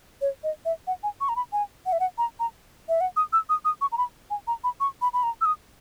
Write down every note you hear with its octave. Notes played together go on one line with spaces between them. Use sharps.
C#5
D#5
E5
F#5
G#5
C#6
A#5
B5
G#5
F#5
E5
F#5
A#5
A#5
E5
F#5
D#6
E6
D#6
D#6
C#6
A#5
B5
G#5
A#5
B5
C#6
B5
B5
A#5
E6
D#6